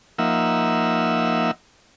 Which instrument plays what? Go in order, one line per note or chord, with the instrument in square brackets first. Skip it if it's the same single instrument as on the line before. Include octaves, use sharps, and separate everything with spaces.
[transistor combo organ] F3 A#3 D#4 E5 F#5 E6